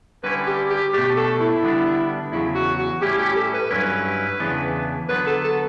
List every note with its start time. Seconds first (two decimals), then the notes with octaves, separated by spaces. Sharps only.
0.24 D3 G3 C#4 E4 B4
0.47 G4
0.70 G4
0.93 B2 A3 D4 G4
1.16 A4
1.40 E4
1.63 D3 G3 B3 D4
2.32 E2 C#3 F#3 E4
2.55 F#4
2.79 F#4
3.01 A2 G3 C#4 E4 G4
3.19 G4
3.36 A4
3.54 B4
3.71 G2 F#3 C#4 E4 B4
4.40 E2 C#3 E3 B3 D4
5.09 D3 F#3 B3 D4 B4
5.27 A4
5.44 A4